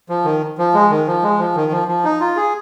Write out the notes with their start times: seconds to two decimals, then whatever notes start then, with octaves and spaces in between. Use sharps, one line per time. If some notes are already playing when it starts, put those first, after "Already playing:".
0.09 F3
0.25 D#3
0.58 F3
0.74 G#3
0.90 D#3
1.07 F3
1.23 G#3
1.39 F3
1.56 D#3
1.71 F3
1.88 F3
2.04 D#4
2.21 F4
2.36 G#4